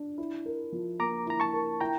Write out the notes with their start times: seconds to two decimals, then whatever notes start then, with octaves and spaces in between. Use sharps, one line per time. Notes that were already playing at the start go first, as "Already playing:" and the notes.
Already playing: D4
0.18 E4
0.46 A#4
0.72 F3
0.99 A#3 A#5 D6
1.27 E4 A#5
1.40 A5 C#6
1.53 A#4
1.81 E4 G5 A#5